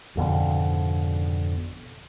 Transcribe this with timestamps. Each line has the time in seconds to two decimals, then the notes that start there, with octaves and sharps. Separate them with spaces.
0.16 G#1 F2 B2 D3